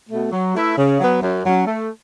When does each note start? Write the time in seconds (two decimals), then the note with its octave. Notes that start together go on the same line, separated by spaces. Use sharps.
0.09 B2 A3
0.32 F#3
0.55 A3 E4 B4 E5
0.77 C#3
1.00 F#3 B3
1.22 F#2
1.45 F#3 C#4
1.67 A3